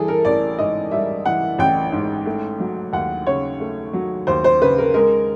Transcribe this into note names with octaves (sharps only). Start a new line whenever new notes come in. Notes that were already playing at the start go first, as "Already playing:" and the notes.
Already playing: E3 G3 G#4 A4
A#4
A1 D5
G#2 D#5
G3 E5
E3 F#5
A1 G5
G#2
A3
F#3
D#2 F#5
C#3 C#5
A3
F#3
D#2 C5
C5
C#3 B4
A#4
G#3 A#4